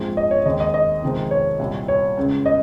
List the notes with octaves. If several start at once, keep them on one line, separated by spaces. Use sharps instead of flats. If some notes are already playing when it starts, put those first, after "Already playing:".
Already playing: A#1 G#2 F3 G#3 C4
D#5
C#5
D#2 D#3 G#3 C4 D#5
D#5
D#5
F2 C3 D#3 G#3 C4
C#5
C2 A#2 G3
C#5
C#2 C#3 G#3
D#5